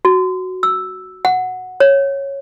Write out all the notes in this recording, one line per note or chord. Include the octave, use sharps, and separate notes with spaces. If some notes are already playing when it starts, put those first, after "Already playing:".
F#4
E6
F#5
C#5